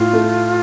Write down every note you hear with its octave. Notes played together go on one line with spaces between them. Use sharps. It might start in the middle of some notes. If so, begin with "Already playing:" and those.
Already playing: A2 F4
A3